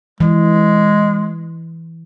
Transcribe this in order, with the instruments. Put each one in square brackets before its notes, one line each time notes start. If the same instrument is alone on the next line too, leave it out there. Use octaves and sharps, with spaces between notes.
[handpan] E3 [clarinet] G#3